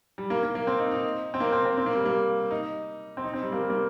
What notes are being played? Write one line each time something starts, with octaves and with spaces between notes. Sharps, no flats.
G3
A#3
A#3
A#3
C4
D#4
D#4
C4
A#3
C4
C4
C4
A#3
G3
A#3
D#4
C4
D#4
C4
G3
A#3
G3
A#3